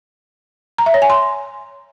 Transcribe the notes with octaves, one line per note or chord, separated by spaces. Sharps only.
A#5
E5
C#5
G#5
C6